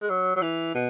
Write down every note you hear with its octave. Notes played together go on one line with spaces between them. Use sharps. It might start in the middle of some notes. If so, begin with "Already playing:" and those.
G#3
F#3
F#3
E3
B2